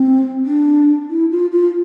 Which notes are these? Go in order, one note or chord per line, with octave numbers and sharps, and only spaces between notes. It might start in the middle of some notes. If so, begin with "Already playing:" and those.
Already playing: C4
D4
E4
F4
F4